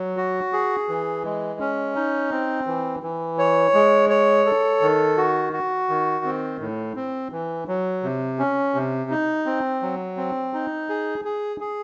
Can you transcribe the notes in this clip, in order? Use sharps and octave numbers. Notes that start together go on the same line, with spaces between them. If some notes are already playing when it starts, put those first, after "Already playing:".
Already playing: F#3
F#4
G#4
E3
G#3
C#4
D#4
C4
E3
E3
C#5
G#3
C#5
A4
D#3
F#4
F#4
D#3
C4
A2
C4
E3
F#3
C3
C#4
C3
D#4
C4
F#3
C4
D#4
G#4
G#4
G#4